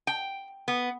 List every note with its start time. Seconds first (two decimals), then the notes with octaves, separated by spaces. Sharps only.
0.07 G5
0.68 B3